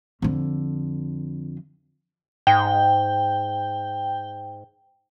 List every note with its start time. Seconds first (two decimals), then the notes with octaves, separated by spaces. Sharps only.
0.22 F2 D3
2.47 G#2 G5